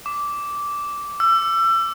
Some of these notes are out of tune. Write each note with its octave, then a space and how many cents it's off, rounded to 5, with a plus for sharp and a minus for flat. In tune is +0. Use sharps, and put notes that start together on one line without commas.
D6 -10
E6 +30